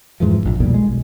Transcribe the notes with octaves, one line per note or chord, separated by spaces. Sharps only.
F2 G#2 E3 F3
D1 A#1
B1 F2 A#2 G3
G#3
B1